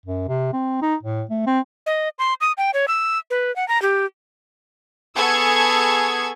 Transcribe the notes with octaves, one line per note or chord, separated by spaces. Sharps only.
F#2
C3
C4
D#4
A2
A3
C4
D#5
C6
D#6
G5
C#5
E6
B4
F#5
A#5
G4
B3 G#4 A4 C#6 E6 G#6